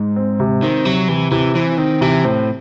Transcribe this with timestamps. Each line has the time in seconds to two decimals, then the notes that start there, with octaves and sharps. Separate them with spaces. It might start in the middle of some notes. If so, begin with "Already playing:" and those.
Already playing: G#2
0.16 C4
0.40 C3
0.63 D#3 C4
0.85 C3 F#3
1.08 C3 E3
1.32 C3 E3
1.55 E3 C4
1.78 D#3 C4
2.01 C3 E3
2.25 A2 C4